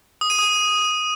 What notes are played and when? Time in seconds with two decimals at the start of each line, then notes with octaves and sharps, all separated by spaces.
0.21 D#6
0.30 D#7
0.39 D#6